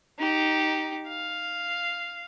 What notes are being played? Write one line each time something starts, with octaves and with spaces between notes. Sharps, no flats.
D#4 G4
F5